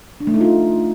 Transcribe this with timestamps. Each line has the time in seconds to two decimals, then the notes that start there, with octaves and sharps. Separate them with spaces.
0.20 D4
0.27 A3
0.34 D#4
0.41 F4